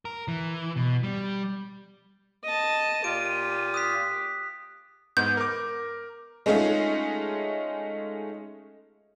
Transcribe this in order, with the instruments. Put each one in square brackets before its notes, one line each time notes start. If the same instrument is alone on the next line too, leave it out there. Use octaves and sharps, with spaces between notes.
[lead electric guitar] A#4
E3
B2
G3
[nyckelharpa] D#5 A5 [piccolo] D#7
[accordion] A#2 F4 [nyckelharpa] G4 [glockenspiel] D7
[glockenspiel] D#6 F#6 B6
[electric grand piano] G#2 B3 [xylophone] G6
[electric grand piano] A#4 D6
[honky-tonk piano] G#3 A3 C#4 D#4 F4